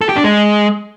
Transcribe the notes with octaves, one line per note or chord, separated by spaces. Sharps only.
A4
G4
D4
G#3